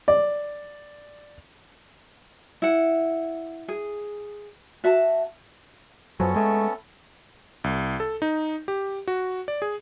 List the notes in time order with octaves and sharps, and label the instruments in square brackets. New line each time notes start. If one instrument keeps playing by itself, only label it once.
[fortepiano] D5
[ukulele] E4 F#5
G#4
F#4 E5 A5
[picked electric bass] F#2 F#3 [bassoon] F3 [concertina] B3 C#4 A4
[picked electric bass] G#3 [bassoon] A3
[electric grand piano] C2
A4
D#4
G4
F#4
D5
G#4